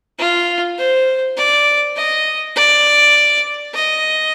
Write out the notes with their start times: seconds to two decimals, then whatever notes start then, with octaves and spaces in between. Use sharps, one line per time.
0.19 F4
0.78 C5
1.37 D5
1.97 D#5
2.56 D5
3.74 D#5